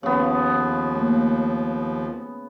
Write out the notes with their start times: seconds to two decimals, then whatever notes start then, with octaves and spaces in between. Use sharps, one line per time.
0.03 D#2 C#3 F3 B3
0.95 A3 A#3